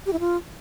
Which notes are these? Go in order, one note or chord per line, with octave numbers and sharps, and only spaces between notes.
G4
E4
F4